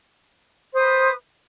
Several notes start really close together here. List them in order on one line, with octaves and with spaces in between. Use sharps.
C5 D#6 B4